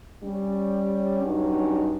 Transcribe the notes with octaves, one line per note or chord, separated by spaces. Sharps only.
G3 C#4
G2 F#3 C#4 D#4